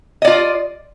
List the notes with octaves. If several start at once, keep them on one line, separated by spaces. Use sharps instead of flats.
F4 D5 D#5